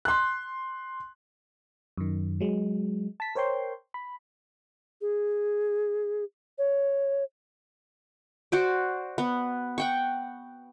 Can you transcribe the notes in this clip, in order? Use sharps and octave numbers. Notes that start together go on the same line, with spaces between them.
C6 F#6
F#2 D#3
F#3 G#3
A5 B6
A#4 C5 C#5 G5 C6
B5
G#4
C#5
F#4 C5 D5
B3
F#5 G5 C#6